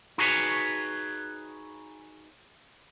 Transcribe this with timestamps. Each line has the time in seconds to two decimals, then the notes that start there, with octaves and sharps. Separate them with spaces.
0.18 D#4 F#4 G#4 B4 C#5